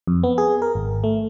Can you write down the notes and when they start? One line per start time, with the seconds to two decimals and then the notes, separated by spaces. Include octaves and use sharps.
0.07 F2
0.23 B3
0.38 G#4
0.62 A#4
0.75 G#1
1.04 A3